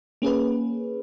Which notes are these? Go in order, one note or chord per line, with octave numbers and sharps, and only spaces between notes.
A#3 C#4 G#4 B4